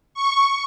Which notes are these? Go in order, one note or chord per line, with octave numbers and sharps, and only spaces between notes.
C#6